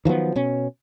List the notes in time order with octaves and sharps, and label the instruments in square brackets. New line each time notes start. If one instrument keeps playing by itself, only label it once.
[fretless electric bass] D#3 F3 F#3 B3
B2 C#4